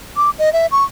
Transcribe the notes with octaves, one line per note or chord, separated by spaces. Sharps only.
D6
D#5
E5
C#6